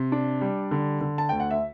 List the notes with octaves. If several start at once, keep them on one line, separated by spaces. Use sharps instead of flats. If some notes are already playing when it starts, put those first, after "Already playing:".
Already playing: C3
D4
G3
D3
D3
A5
D2 G5
F#5
E5